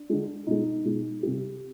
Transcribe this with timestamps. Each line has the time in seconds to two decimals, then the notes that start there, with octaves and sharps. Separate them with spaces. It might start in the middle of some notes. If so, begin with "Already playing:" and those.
Already playing: D4
0.10 D3 G#3
0.47 B2 G#3 D#4
0.85 B2 G#3
1.23 C3 G3 G4